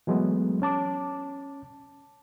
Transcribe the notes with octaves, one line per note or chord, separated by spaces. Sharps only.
E3 F#3 G#3 A3 B3
C#4 A5 D6